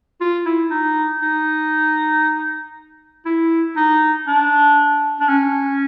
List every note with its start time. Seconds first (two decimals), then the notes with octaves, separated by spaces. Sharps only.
0.21 F4
0.46 E4
0.71 D#4
1.22 D#4
3.26 E4
3.77 D#4
4.27 D4
5.20 D4
5.29 C#4